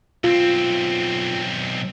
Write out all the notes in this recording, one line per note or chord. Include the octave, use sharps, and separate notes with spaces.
B1 C4 F4